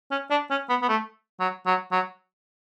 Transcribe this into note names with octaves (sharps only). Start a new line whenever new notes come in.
C#4
D4
C#4
B3
B3
A3
F#3
F#3
F#3